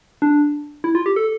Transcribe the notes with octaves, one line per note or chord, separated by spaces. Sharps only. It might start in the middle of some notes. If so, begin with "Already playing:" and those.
D4
E4
F4
G4
A4